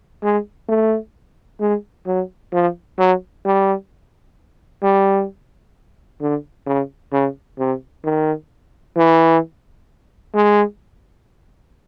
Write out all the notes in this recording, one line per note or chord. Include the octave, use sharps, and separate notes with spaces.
G#3
A3
G#3
F#3
F3
F#3
G3
G3
D3
C#3
C#3
C3
D#3
E3
G#3